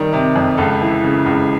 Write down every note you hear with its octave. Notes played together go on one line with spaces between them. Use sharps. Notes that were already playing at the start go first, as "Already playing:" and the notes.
Already playing: D#3 G3
C3
F2
C#2 A4
E3
C#3
C#2